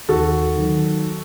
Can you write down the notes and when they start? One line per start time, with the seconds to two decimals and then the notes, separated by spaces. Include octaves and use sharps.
0.09 D#2 F#4 A4
0.56 D#3 F#3